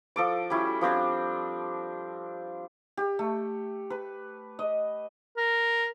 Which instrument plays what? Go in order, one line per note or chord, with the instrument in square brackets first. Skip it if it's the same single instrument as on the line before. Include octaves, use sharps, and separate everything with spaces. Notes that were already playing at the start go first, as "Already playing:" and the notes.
[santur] F3 A4 D6
G3 C#4 E4 F#4
F3 G3 C4 D4
G4
A3
B4
D#5
[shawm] A#4